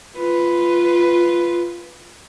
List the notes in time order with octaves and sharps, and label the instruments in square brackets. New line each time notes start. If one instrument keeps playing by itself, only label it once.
[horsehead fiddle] F4 B4